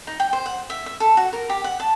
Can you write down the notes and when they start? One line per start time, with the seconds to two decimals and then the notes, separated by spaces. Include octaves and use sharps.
0.07 D#4
0.20 G5
0.33 C5
0.46 F#5
0.70 E5
0.86 E5
1.00 A4
1.17 F#4
1.33 A#4
1.49 G4
1.64 F#5
1.80 A5